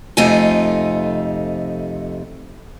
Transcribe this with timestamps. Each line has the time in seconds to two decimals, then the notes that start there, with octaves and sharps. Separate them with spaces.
0.17 F2 C3 A3 D#4 F4 G#5